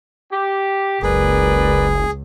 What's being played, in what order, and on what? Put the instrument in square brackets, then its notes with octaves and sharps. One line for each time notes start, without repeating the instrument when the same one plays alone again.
[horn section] G4
[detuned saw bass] F#1 [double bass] C#2 [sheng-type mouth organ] G#4 [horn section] A#4 B4 D5